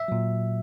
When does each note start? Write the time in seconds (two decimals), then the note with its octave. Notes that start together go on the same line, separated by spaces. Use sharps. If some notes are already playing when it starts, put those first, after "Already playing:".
Already playing: E5
0.08 A#2 F#3